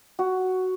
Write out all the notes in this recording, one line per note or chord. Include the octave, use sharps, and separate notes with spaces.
F#4